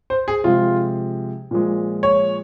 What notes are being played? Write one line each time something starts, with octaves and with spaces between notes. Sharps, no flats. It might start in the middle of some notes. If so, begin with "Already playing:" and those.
C5
G#4
C3 F3 G#3 F4
A#2 F3 G#3
C#5